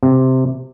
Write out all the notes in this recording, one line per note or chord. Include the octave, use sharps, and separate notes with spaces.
C3